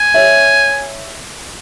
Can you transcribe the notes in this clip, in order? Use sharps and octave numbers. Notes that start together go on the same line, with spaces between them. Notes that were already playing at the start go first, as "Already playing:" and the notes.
Already playing: G#5
C#5 E5